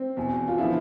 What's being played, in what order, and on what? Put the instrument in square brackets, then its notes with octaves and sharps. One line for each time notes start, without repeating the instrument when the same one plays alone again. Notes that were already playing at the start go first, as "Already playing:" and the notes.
Already playing: [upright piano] C4
E2 B2
F4
D3 F3 E4